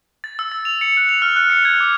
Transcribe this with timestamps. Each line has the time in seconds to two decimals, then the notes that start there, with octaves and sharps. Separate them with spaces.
0.24 A6
0.39 E6
0.52 A6
0.65 F7
0.81 C#7
0.97 F#6
1.09 F7
1.22 F6
1.36 F#6
1.50 C#7
1.65 G#6
1.80 D6